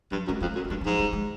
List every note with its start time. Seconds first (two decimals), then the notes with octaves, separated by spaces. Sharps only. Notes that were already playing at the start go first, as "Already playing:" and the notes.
0.11 G2 F#3
0.27 F#2 G#3
0.41 F2 A3
0.55 F#2
0.65 G#3
0.70 G2 G3
0.81 E3
0.85 G#2 F3
0.99 G3
1.13 G#3